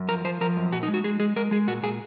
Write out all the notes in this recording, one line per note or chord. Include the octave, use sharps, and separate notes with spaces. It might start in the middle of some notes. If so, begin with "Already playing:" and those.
Already playing: F#2
F3 A#4
F3 C5
F3 A#4
F#2
A#2 F#4
D#4
G#3
F#4
G#3 G#4
G#3 G#4
G#3 A#4
G#3 G#4
A#2 F#4
A#2 G#4